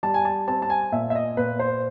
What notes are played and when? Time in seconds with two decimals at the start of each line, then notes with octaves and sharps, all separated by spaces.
0.03 G3 A5
0.14 G#5
0.25 A5
0.47 C4 A5
0.62 A5
0.70 G#5
0.92 A#2 E5
1.10 E5
1.15 D#5
1.37 A#2 B4
1.59 C5